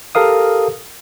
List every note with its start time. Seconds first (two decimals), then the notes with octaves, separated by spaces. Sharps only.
0.15 G4 A4 A#4 F5 D#6